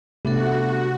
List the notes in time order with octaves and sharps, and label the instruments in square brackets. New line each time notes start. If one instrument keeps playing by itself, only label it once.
[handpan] C3 A3 [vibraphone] B3 D4 A4 [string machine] F#4